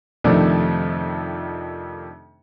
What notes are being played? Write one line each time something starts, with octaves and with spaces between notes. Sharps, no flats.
F2 C3 D#3 F3 A3 D4